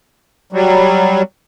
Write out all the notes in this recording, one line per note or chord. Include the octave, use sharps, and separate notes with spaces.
F#3 G3